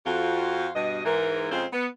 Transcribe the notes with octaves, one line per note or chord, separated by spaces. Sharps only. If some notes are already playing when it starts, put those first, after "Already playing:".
F2 F4 F#4
G2 B2 D#5
G#2 E3 A#4
F2 C#3 G#3 C4 F4 C5
B3